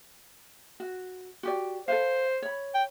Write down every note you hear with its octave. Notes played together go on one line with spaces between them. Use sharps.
F#4
F#4 G4 D5
A4 B4 C5 F5
C#5 B5
G5